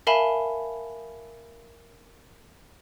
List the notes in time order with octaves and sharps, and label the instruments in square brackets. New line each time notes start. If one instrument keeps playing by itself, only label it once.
[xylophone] A#4 E5 F5 G#5 A5 B5